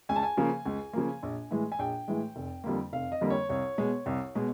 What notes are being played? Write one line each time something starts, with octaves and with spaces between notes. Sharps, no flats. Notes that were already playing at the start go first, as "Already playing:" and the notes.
C#2 G#5
A5
G#5
C#3 F3 A#3
C#2
C#3 F3 A#3
A#1
A2 E3 G#3
G#5
A#1 G5
A2 E3 G#3
F1
F2 D3 G3 A#3
F1 F5
D#5
F2 D3 G3 A#3
C#5
C2 C#5
B2 G#3
C2
B2 G#3